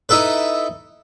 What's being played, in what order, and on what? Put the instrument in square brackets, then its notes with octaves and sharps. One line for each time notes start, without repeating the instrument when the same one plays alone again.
[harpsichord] D#4 E4 A4 B4